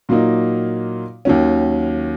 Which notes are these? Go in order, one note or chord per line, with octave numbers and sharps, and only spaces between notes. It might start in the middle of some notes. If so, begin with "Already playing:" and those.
A#2 F#3 A#3 D#4
D#2 D#3 F#3 C#4